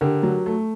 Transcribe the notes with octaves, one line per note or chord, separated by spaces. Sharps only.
D3 G4 A#4
F#3
A3